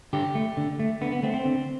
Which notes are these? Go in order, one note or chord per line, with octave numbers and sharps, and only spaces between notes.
D3 G4
A3
D3
A3
D3 B3
B3
A3 C4
C4
D3